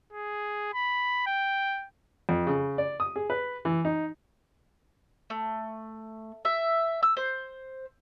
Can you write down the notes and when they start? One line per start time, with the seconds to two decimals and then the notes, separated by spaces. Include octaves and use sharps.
0.13 G#4
0.74 B5
1.27 G5
2.29 F2
2.47 C#3
2.78 D5
3.00 D#6
3.16 G#4
3.30 B4
3.65 E3
3.85 D#4
5.30 A3
6.45 E5
7.03 E6
7.17 C5